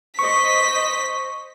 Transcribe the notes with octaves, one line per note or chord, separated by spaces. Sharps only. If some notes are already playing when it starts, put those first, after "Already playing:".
C5 D#5 C#6 B6